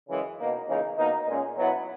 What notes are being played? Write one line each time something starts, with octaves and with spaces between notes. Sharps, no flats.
F#2 C#3 E3 G#3
B2 A#3 D#4
C#2 C#3 E3 A#3 D#4
B2 A#3 D#4
A#2 G#3 C#4 G#4
B2 F#3 B3 E4 B4